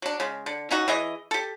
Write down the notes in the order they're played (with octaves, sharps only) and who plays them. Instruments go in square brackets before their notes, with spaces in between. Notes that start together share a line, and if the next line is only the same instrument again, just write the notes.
[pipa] F#3 D4
C#3 G#3
D3
C#4 D#4 F#4
E3 G#4 D#5
G4 A4